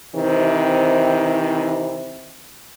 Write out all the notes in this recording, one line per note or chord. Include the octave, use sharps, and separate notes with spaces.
C3 D#3 E3 C4